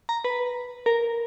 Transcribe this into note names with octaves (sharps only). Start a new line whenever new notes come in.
A#5
B4
A#4